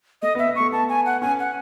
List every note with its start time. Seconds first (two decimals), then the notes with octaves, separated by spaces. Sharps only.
0.22 A3 D#5
0.35 B3
0.39 E5
0.47 B3
0.56 A3 C#6
0.72 B3 A5
0.89 G#5
1.06 F#5
1.22 C#4 G#5
1.39 F#5